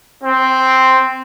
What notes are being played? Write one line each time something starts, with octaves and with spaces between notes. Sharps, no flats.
C4